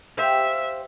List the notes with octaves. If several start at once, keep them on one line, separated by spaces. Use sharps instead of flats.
G4 C5 E5 F5